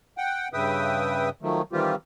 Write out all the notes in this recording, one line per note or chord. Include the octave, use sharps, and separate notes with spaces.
F#5 G5
G2 C#3 B4 E5 G5 D#6
D#3 F3 F#3 A3
D#3 E3 G3 C4 F4 G4